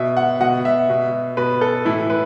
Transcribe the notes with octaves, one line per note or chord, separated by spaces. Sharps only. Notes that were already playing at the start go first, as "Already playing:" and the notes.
Already playing: B2 E5
F#5
B2 F#5
E5
B2
B2 B4
A4
A2 E3 E4
B4